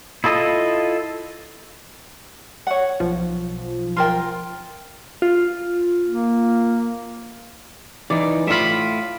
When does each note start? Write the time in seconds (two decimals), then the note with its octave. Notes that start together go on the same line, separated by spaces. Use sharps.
0.24 E4 F4 A4 D#5
2.67 C#5 F#5
3.00 B1 F3
3.97 F4 A#4 G5
5.22 F4
6.06 A#3
8.10 E3 D#4 D5
8.47 A2 F4 E5 B5